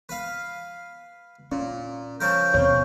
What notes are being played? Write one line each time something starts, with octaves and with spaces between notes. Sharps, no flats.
B4 F5
A#2 C#4
C#3 F3 A#4 G6
D#2 B2 C4 C#5